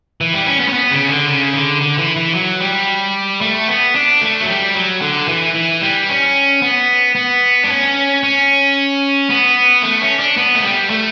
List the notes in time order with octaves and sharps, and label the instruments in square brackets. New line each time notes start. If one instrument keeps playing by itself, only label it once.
[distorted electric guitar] E3
G3
C#4
B3
C#4
B3
C#3
D3
C#3
D3
D3
E3
E3
F#3
G3
A3
B3
D4
A3
F#3
G3
F#3
D3
E3
E3
G3
C#4
B3
B3
D4
C#4
C#4
B3
A3
C#4
D4
B3
A3
G3
A3